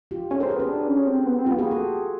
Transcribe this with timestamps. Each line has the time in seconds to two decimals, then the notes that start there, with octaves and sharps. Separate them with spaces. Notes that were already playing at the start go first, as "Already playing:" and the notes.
0.11 F4 G4
0.31 C#4 G4 A4
0.40 C4 G#4 A#4
0.49 G4 A4
0.56 B3 F#4 G#4
0.69 D4
0.88 C#4
1.07 C4
1.26 B3
1.39 C4
1.46 B3 F4 G4
1.58 A#3 F#4 G#4
1.71 G4 A4